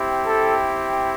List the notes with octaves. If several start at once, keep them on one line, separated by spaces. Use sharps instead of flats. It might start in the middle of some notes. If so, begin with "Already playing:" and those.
Already playing: C4 E4 G4
A4